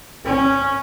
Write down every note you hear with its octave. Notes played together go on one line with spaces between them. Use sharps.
C#4